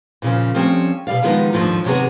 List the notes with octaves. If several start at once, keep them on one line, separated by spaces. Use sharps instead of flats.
A#2 C#3 F3
F3 G3 A3 C4 C#4
B2 G3 D5 F5
D#3 F3 G3 G#3 B3 D#4
D#2 G#2 F3 A3 D4 D#4
D#2 C3 F#3 B3 G#4